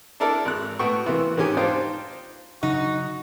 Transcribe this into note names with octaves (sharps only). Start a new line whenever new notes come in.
D4 E4 A4 A#4 D5
G#1 F#6
A2 B3 F#4 G5 C#6
C3 E3 A#3 B3
G#2 D#3 C#4 G4 G#5
D4 D#4 F4 C5 G5
C#3 F#3 D#4 F#4